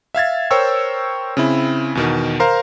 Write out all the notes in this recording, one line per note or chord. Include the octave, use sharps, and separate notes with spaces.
E5 F5 G#6 A6
A#4 C5 C#5 G5 C#6 E6
C#3 C4 E4
E2 B2 D#3
A#4 C5 F5 A#5 C6